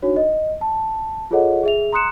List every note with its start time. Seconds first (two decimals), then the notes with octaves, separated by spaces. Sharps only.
0.02 D4 D#4 F#4 C#5
0.16 D#5
0.61 A5
1.31 F4 G#4 A4 C#5 D#5 F#5
1.63 G#4 E5 F7
1.92 A#5 C6 D#6 F#6 C#7 E7